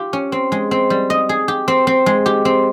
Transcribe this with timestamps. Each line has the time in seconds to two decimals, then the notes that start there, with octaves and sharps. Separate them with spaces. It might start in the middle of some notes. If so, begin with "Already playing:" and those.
Already playing: F4 G4
0.13 C#4
0.32 C4
0.52 G#3
0.71 C4
0.90 G3
1.10 D#5
1.29 G#4
1.48 G4
1.68 C4
1.87 C4
2.06 G#3
2.26 G4
2.45 C4